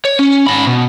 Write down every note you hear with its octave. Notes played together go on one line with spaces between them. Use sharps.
C#5
C#4
G#2 B5
B2